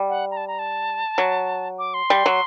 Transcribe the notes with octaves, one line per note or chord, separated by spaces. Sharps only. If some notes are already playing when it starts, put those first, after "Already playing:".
Already playing: G3
F#5
A#5
A5
A#5
A5
F#3
D6
C6
G3
F#3